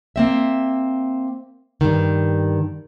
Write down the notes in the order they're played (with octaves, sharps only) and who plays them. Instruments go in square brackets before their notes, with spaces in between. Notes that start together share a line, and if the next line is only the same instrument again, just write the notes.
[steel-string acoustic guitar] A#3 C4 E5
G2 D#3